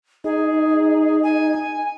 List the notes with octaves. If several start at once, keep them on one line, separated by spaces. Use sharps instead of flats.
D#4 G#4
G#5